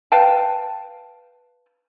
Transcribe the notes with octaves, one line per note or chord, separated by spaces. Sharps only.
B4 F5 G5 A5